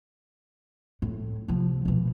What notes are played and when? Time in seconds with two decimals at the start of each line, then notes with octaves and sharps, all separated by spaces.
1.02 A2
1.48 C3 F3
1.85 B2 D#3